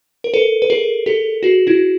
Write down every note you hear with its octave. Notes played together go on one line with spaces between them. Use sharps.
A#4
A4 B4
B4
G#4 A#4
G4 A4
F#4 G#4
E4 F#4